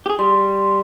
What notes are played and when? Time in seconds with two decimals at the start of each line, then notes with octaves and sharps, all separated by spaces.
0.06 G4 G#4
0.19 G3 C6